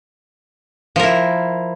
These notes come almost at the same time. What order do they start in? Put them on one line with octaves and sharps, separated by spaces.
F3 A#4 E4